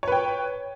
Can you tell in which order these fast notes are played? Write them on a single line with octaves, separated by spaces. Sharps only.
C#5 B4 G5